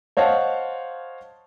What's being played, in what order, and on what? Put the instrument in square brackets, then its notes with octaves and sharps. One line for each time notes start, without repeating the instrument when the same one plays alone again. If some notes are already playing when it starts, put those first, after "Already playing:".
[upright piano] C5 C#5 D#5 F5 F#5 A5